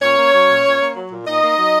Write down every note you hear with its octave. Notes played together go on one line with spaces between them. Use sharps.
A#2 C#4 C#5
A#3
F#3
A#2
A#2
A#3
F#3
A#2
A#2 D#4 D#5
A#3
F#3